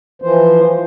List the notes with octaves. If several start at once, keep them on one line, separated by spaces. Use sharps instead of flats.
E3 F3 C5